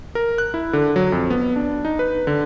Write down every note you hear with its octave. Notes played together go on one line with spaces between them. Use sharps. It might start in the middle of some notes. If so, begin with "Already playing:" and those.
A#4
F#6
E4
D3
F#3
F2
B3
D4
D#4
B4
D3